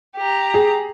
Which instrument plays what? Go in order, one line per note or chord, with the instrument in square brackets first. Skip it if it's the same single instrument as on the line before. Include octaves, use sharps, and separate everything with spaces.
[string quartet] G4 A#5
[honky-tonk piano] G#4